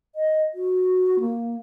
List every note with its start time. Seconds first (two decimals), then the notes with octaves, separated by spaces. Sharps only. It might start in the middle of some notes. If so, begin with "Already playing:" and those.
0.15 D#5
0.54 F#4
1.20 A#3